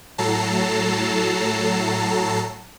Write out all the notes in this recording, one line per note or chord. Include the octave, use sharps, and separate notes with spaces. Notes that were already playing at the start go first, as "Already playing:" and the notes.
A2 F#3 A4 A5 A#5 C7